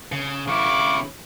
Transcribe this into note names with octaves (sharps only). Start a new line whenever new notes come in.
C#3
C#3 E4 F5 C#6 D6